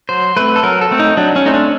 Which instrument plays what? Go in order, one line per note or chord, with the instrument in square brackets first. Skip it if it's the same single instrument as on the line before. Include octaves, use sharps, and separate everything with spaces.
[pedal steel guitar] F#3 C5
A3 C4 B4
A4
F#3 A#4
A4
A3 C4
D#4
F#3 D4
C#4
A3 C4 D#4
D4